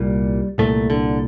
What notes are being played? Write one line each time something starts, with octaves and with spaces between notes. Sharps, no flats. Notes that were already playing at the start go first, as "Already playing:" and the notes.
Already playing: C2 A#2 G3
C2 A#2 A3
D3